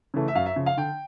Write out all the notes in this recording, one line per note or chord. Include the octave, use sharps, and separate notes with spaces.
C#3 E3 A3
E5
F#2 F5
E5
C#3 F3
F5
D3 G5